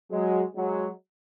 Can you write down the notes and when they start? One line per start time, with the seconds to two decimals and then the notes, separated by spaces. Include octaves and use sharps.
0.11 F#3 G#3
0.56 F#3 G#3